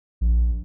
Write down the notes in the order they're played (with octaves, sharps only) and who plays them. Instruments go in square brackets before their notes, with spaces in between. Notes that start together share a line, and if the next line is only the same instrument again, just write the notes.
[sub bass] A#1